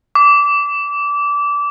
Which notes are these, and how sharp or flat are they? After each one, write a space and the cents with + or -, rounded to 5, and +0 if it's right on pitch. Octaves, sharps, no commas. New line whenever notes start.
D6 -20